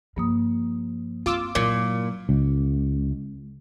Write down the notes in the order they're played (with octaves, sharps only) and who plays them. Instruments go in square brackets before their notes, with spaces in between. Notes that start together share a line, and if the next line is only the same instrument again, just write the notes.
[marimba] G2 A#3 D#6 [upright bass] F3
[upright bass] C4 [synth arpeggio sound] F4 D6 E6
[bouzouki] A#2 [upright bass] F#3 E4
[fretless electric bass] C#2